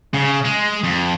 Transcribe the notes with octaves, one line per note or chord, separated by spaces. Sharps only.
C#3
G#3
F2